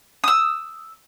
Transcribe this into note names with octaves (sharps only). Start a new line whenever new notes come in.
D#6 E6